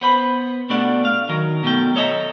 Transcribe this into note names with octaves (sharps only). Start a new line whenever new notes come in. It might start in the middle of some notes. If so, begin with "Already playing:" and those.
B3 C5 B5
B2 G3 A3 D4 D5 F#5
F5
D#3 F#3 A#4
B2 F#3 A3 G5
A4 C#5 D#5 E5 G5 A#5